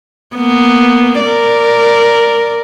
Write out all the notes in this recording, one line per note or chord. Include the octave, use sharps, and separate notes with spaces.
A#3 B3
A#4 D5